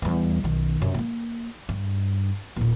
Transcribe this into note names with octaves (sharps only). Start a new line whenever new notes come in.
E2 G3
B1 D#3
F#2 C3
A3 A#3
G2
D#1 A#2